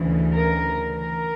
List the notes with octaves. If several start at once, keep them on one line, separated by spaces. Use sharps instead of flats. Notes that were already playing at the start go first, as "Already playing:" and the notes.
Already playing: D2 C#3 E3
A#4
A#4